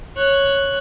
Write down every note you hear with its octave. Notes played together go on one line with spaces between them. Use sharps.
C#5 F#6